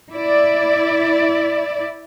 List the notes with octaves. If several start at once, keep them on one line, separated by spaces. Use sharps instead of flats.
E4 D5